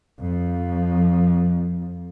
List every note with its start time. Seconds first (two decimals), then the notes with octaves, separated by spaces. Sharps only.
0.20 F2 F3